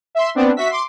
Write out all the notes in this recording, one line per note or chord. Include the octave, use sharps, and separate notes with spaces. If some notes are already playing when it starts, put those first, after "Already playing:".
E5 C6
B3 C4 D4
F#4 E5 B6
C6 D6